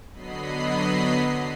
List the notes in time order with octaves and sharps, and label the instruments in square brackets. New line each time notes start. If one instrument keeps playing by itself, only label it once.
[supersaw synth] D3 F#3 B3 D#5 B5 C7